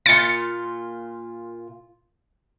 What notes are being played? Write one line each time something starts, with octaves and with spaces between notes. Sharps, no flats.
A#2 F4 A6 C#7